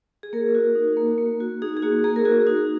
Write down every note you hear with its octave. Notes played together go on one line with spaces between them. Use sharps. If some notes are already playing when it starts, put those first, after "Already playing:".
G#4
A#3 A#4
F#4
D#4
A#3
A#3
F#4
D#4 G#4
G#4
A#3 F#4
A#3 G#4
A#4
F#4 G#4
D#4 F#4